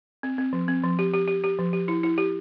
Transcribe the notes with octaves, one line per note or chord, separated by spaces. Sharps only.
C4
C4
F3
C4
F3
G4
G4
G4
G4
F3
G4
E4
E4
G4